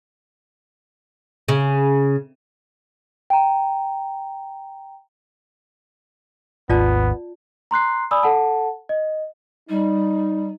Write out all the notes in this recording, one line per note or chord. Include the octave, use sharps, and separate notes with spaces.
C#3
G5 A#5
G#1 D#2 B3 F4 D5 A5
A#5 C6 F#6 C7
D5 G#5 B5 D#6 E6
A4 F#5 A5
D#5
G3 D#4